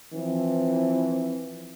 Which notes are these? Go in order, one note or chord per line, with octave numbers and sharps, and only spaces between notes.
E3 F3 C4